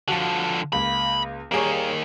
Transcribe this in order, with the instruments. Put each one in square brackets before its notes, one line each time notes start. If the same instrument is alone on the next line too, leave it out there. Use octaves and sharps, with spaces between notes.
[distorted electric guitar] D3 F3 [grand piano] F#4 A5
[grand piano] C#2 A#3 [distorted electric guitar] B5
[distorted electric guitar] D#2 A#3 [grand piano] G3 G#4 C#5